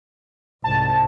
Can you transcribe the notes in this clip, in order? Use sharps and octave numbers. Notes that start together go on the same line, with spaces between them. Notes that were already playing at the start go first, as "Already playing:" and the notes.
C2 G#2 A5